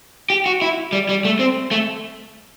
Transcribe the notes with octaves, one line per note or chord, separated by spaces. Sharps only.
G4
F#4
E4
G3
G3
A3
C4
A3